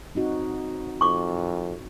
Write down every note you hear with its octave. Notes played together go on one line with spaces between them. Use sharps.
C4 D#4 F#4
F2 C#6 D6